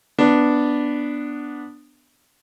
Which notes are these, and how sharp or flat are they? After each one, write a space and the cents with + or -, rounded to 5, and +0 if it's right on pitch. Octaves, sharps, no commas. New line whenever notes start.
B3 +0 D4 +0